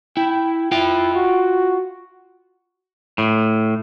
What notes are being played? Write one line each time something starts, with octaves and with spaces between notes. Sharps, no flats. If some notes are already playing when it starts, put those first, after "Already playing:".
E4 G5
E4 F4 G5
F#4
A2